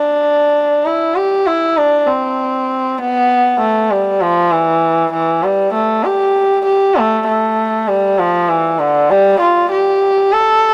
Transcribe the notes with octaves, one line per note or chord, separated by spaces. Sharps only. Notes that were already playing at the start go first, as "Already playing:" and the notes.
Already playing: D4
E4
G4
E4
D4
C4
B3
A3
G3
F3
E3
E3
G3
A3
G4
G4
A3
A3
G3
F3
E3
D3
G3
F4
G4
A4